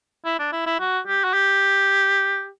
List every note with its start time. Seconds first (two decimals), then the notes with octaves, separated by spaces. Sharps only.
0.25 E4
0.39 D4
0.52 E4
0.66 E4
0.80 F#4
1.07 G4
1.24 F#4
1.34 G4